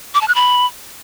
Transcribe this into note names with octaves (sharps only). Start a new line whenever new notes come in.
D6
A5
F#6
B5